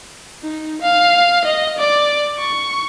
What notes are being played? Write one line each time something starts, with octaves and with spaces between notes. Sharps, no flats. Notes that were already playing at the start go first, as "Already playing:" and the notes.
D#4
F5
D#5
D5 D6
C#6